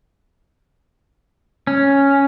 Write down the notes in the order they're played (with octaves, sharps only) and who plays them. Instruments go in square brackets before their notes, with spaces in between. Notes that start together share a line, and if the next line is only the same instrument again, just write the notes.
[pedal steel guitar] C#4